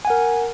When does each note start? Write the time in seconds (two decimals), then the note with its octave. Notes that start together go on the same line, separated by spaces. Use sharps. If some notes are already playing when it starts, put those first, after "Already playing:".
0.05 G#5
0.07 F#5
0.10 A#4